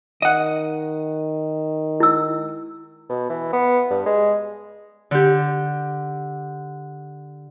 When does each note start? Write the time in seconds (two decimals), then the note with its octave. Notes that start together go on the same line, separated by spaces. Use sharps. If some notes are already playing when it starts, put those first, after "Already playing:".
0.22 D#3 D#5 F#5
2.00 E4 E6
3.09 B2
3.30 E3
3.53 B3
3.90 G2
4.06 G#3
5.11 D3 G4